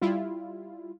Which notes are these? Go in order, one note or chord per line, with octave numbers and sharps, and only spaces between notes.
G3 E4 F4